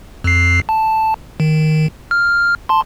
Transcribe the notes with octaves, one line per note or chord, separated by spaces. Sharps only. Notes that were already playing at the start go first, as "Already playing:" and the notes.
F2 C7
A5
D#3
F6
A5 C6